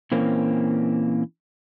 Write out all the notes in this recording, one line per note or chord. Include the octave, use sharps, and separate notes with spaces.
A#2 E3 A#3 C4 C#4